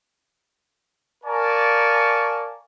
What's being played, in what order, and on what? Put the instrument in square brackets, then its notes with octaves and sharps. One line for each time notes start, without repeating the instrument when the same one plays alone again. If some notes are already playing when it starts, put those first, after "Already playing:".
[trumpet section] A#4 D5 F5 G#5 A5 C#6